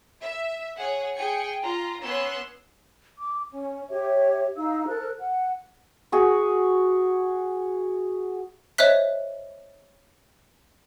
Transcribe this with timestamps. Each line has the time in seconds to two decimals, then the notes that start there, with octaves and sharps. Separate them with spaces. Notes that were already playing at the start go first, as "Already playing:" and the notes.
0.22 E5
0.78 G#4 C#5 F#5
1.16 G#4 G5 G#5 C#7
1.64 F4 A#5
2.02 B3 C#4 C#5 C6 E6 F#6
3.18 D6
3.50 C#4
3.89 G4 C#5 E5
4.56 D#4 E4 F5 E6
4.86 A4 A#4 C5 F#6
5.19 F#5
6.12 F#4 G#4
8.78 C5 C#5 D#5 E5 F#6 B6